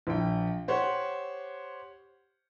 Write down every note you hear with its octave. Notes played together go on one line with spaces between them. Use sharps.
A#1 G5
G4 C5 C#5 F#5